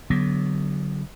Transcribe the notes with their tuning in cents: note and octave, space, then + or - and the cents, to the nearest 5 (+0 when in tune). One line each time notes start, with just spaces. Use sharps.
D3 -20 F#3 +15 B3 +0